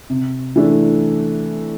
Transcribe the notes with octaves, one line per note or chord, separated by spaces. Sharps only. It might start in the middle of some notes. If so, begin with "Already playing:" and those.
C3
E3 A3 D4